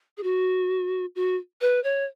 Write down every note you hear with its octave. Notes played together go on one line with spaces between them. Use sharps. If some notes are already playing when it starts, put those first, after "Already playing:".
G#4
F#4
F#4
B4
C#5